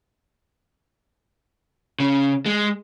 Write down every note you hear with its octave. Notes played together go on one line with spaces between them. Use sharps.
C#3
G#3